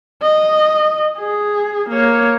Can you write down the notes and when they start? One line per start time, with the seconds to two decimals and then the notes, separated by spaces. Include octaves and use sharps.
0.22 D#5
1.18 G#4
1.89 A#3 C#5